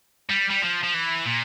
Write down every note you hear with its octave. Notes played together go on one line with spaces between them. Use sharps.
G3
G3
F3
F3
E3
A#2